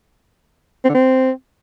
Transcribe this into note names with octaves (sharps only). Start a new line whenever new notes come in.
C4
D3
C4